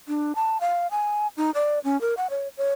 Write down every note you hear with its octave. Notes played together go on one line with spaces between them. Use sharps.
D4
A5
F5
G#5
D#4
D5
C#4
A#4
F#5
C#5
C#5